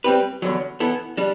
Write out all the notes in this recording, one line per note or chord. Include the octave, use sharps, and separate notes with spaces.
G3 C4 G4 B4
E2 D3 F#3
E3 B3 E4 A4
G3 D4